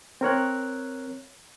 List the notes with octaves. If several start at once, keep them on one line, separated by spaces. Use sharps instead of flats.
C4 A#4 C#5 F#6